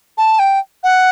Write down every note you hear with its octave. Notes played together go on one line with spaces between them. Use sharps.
A5
G5
F#5